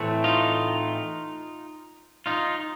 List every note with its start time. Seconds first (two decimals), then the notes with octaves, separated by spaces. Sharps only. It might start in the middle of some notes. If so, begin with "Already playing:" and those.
Already playing: A2 E3 A3 C4
0.24 D#4 F4
2.26 D#4 F4